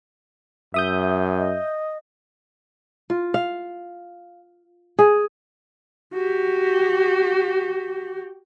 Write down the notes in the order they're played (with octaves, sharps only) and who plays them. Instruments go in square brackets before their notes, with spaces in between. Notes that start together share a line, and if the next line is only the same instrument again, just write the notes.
[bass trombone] F#2 [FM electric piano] E5 D#6 G6
[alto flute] D#5
[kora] F4
F5
G#4
[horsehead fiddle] F#4 G4